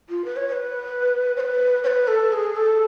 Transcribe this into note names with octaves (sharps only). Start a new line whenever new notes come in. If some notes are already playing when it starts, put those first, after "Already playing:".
F4
B4
C#5
C#5
B4
C#5
B4
C#5
B4
A4
G#4
A4